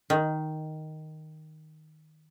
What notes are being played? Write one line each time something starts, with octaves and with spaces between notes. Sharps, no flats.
D#3